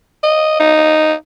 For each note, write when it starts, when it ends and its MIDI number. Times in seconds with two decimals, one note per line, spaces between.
0.23 0.55 75
0.60 1.13 63